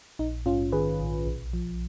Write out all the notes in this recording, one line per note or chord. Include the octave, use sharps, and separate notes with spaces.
A#1 D#4
G#2 C#4 F4
D#3 G#4 B4
A#1
B1
F3